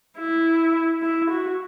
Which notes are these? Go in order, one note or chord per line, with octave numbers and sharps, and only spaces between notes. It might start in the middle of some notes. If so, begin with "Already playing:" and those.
E4
E4
F#4